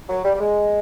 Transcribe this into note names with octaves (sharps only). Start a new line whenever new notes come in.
F#3
G3
G3
G#3